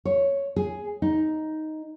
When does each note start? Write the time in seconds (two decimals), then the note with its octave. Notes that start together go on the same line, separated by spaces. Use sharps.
0.05 C#5
0.56 G#4
1.02 D#4